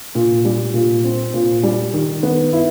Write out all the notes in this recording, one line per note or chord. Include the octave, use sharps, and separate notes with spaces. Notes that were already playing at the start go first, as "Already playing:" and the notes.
A#2
G3
A#2
C4
A#2
G3
D#3
B3
E4